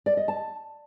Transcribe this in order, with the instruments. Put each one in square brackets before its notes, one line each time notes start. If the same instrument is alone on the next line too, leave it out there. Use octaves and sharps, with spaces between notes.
[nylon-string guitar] D5
D#5
A5